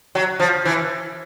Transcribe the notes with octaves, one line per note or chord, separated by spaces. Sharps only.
F#3
F3
E3